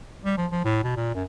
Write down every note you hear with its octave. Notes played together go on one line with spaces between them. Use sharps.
G3
F3
F3
A2
B2
A#2
F#2